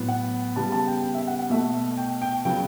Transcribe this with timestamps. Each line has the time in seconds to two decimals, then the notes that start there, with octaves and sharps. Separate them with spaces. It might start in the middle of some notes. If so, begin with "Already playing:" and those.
Already playing: A2 F#3 B3
0.08 F#5
0.56 C#3 G3 B3 A5
0.72 A5
0.87 G5
1.03 G5
1.14 E5
1.27 F#5
1.39 F#5
1.50 B2 A3 E5
1.74 E5
1.98 G5
2.22 G5
2.45 C#3 F#3 B3 G5